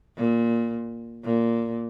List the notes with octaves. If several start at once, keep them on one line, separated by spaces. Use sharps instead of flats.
A#2
A#2